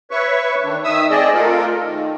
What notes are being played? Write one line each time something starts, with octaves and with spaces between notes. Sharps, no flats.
B4 C#5 E5 C#6
D#3 D4
D#3 E5 D#6 E6
A3 C4 G#4 D5 D#5
A3 F4 A4 A#4
D#3